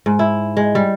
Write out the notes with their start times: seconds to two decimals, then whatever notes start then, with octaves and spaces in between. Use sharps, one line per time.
0.06 G#2
0.19 E4
0.57 G#3
0.75 G3